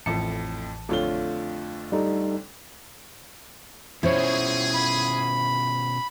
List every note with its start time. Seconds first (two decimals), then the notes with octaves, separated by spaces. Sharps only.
0.06 A1 F2 A2 A5 C#7
0.89 F2 D3 A3 F4 C#5 G7
1.92 G3 D#4 A4
4.03 B2 C#4 E4 F4 G#4 C5 C#5
4.74 B5